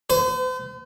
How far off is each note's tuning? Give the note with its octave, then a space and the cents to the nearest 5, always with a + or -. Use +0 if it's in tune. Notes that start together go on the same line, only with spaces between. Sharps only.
C5 -45